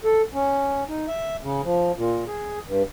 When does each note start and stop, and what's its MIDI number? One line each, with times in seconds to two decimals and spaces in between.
0.04 0.22 69
0.34 0.84 61
0.88 1.06 63
1.08 1.36 76
1.43 1.61 49
1.63 1.92 53
1.97 2.24 46
2.27 2.59 68
2.66 2.83 43